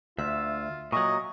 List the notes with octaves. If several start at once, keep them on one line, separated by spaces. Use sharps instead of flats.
D2 F4 E5
A#2 F#3 D#5 C#6